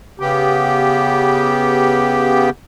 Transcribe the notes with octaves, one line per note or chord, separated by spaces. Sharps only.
C#3 B3 G4